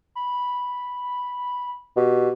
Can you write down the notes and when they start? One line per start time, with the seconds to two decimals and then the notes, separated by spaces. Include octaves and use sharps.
0.15 B5
1.96 B2 G4